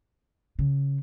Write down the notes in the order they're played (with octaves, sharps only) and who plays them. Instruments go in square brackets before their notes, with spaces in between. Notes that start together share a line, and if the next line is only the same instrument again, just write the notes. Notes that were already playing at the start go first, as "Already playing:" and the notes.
[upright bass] C#3